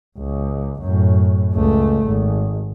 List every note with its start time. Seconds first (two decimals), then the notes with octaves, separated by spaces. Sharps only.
0.18 C#2
0.81 F#2 A2
1.54 C#2 A3
2.07 G#1